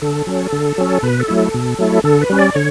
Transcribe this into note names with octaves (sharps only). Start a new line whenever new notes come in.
D3 A4
F#3 C#4
D3
F#3 C#4
B2 B4
A4
F#3 A3 E4
A4
B2
F#3 A3 E4
D3 A4
B4
G3 C#4
D5
D3 C#5